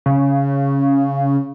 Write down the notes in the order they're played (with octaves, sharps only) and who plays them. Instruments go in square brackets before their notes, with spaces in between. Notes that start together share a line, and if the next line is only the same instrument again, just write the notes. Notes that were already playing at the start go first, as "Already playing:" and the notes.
[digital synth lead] C#3